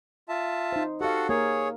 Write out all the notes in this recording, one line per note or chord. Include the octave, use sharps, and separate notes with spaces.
F4 E5 A5
D#4 C5
F#4 G4 A4 F5 F#5
A#3 G#4 A#4 C#5